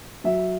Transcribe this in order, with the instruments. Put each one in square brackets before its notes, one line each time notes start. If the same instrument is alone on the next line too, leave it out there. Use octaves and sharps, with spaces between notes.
[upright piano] F#3 E5